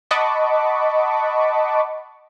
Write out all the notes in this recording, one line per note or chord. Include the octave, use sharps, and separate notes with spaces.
D#5 F#5 A5 B5 C#6 D6